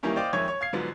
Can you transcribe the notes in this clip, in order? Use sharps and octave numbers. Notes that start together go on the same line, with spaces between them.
D#3 E3 G3 A#3 C#4 E4
C5 D5 D#5 F5 G5 D6
F2 D#3 G#3 C#5 E5 G#6
C#5
F5 G#6 C7
G#2 D3 F3 F#3 B3 D4